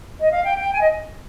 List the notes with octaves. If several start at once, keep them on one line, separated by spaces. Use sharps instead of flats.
D#5
F5
G5
G5
G#5
D#5